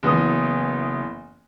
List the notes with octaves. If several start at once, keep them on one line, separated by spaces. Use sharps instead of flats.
F#1 E3 B3 D#6